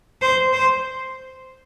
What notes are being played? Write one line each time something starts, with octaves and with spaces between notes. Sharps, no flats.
C5
C5